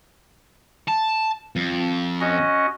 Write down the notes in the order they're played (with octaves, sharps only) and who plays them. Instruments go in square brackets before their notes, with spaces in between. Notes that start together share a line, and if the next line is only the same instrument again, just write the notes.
[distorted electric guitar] A5
F2
[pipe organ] C#4 F#4 D#5